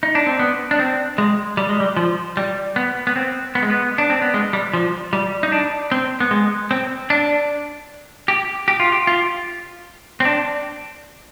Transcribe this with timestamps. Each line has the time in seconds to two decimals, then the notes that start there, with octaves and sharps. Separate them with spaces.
0.03 D#4
0.15 D4
0.27 C4
0.39 B3
0.71 D4
0.79 C4
1.18 G#3
1.57 G3
1.69 G#3
1.80 G3
1.97 F3
2.37 G3
2.76 B3
3.07 B3
3.16 C4
3.55 B3
3.62 G#3
3.70 B3
3.98 D4
4.10 C4
4.22 B3
4.34 G#3
4.53 G3
4.73 F3
5.13 G3
5.43 D#4
5.52 D4
5.92 C4
6.20 B3
6.31 G#3
6.71 C4
7.10 D4
8.28 G4
8.68 G4
8.80 F4
8.92 G4
9.07 F4
10.20 C4
10.25 D4